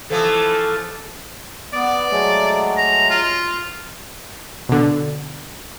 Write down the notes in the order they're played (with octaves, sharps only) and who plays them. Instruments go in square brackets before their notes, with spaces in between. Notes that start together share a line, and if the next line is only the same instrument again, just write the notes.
[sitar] E3 F3 A3 [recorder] A4
[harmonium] B3 [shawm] D5
[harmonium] F#3 G#3 A3
[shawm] A#5
F4
[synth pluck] B2 D3